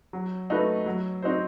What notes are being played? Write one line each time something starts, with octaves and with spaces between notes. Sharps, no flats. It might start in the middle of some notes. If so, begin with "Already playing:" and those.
F#3
A3 D#4 F#4 B4
F#3
C4 D#4 F#4 C5